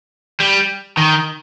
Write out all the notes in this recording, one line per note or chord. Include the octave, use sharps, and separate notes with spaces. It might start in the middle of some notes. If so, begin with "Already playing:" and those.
G3
D#3